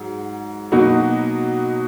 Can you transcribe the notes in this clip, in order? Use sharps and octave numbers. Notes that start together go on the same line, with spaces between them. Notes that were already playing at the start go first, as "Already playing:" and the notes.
Already playing: G#2 F#3
B2 F#3 A#3 D#4 F#4